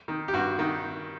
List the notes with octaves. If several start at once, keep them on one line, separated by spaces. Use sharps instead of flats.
D#3
G4
G2 F#4
D#3